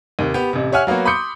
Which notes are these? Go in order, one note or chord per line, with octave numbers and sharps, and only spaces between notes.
D#2 C3
B3 G4
A1 C3
G4 C#5 E5 F#5 G#5 F6
F#3 A#3 B3 F#4
B5 C6 D6 D#6 G6 C#7